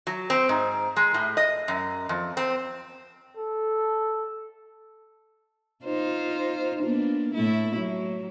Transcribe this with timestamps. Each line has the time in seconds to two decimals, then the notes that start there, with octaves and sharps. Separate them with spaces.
0.07 F#3
0.30 C4
0.49 G#2
0.96 G#3
1.14 A2
1.37 D#5
1.68 F#2
2.09 F2
2.37 C4
3.37 A4
5.85 D#4 F4 C5
6.83 A#3 B3 D4
7.34 A2 A3 E4
7.76 F#3